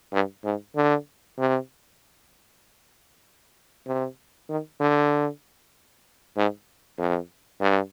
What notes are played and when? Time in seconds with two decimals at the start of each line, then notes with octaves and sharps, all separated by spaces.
0.13 G2
0.44 G#2
0.76 D3
1.38 C3
3.87 C3
4.50 D#3
4.80 D3
6.37 G#2
6.99 F2
7.61 G2